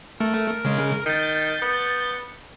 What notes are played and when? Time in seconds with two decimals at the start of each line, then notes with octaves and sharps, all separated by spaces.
0.20 A3 A#4
0.65 C#3 G#3
1.06 D#3 G6 A6
1.62 B3